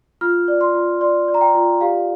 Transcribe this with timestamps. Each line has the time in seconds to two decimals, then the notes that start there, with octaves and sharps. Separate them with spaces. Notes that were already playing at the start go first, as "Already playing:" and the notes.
0.21 F4 F6
0.48 D5
0.61 C6
0.75 F4
1.01 D5 C6
1.28 D5
1.34 A#5
1.41 G5
1.55 F4
1.81 G4 F5